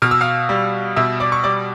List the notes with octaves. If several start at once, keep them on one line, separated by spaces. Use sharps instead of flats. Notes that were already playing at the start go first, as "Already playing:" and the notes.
B2 F6
E6
F5 F6
G3
B2 E5 E6
D5 D6
C#6
G3 D5 D6